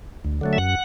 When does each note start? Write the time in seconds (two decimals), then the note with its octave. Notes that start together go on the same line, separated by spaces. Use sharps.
0.24 D2
0.41 D3 F#3 A3
0.53 E5
0.58 F#2 F#5